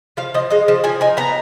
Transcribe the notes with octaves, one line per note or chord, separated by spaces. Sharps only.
F3 F5
F3 D#5
G#3 D#5
F3
F3 G#5
D#4 G#5
B3 A#5